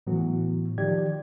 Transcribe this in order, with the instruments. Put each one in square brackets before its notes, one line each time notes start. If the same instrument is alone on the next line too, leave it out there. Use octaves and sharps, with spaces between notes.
[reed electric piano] A2 E3 F#3 B3 F#4
D#3 F3 G4 D5 G#6